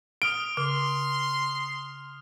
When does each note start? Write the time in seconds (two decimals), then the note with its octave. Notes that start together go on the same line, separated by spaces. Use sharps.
0.22 D#6 F6 D7 G7
0.57 C#3 C6 F6